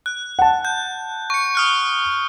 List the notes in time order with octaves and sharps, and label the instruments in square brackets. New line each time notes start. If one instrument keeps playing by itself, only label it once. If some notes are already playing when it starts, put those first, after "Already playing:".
[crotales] F#6
[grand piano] F#5 A5
[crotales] G6
C#6 C#7
D#6 F6 F#6